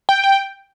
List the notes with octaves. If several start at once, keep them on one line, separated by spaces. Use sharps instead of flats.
G5
G5